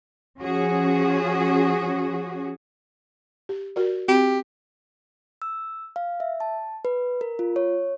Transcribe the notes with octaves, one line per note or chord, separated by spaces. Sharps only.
F3 C#4 F#4 G#4
G4
F#4 A#4 D5
C4 F#4 G4
E6
F5
E5
A5
B4
A#4
F4
C#5